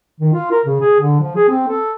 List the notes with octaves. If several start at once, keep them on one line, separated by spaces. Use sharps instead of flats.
D#3
F4
A#4
C#3
G#4
D3
F3
G#4
C4
A4